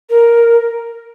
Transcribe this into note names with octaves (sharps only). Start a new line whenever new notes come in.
A#4